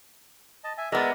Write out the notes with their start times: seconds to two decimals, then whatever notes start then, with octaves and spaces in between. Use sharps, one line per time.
0.64 D#5 A5
0.78 E5 G#5
0.92 G#3 B3 A#4 D5 E5